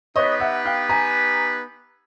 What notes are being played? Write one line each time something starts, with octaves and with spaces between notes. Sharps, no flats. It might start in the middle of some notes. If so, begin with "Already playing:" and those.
B3 D#4 G4 B4 C#5 D#5
E5 F#5
F5 G5
G#5 A#5